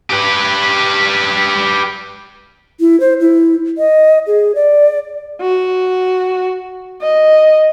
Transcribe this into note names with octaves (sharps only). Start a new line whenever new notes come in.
G4 B4
E4
C5
E4
D#5
G#4
D5
F#4
D#5